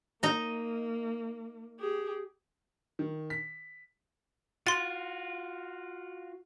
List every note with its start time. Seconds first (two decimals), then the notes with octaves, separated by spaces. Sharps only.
0.23 A#3 D#4 A#5
1.79 G4 G#4
2.99 D#3
3.30 B6
4.67 F4 F#4 C6 A6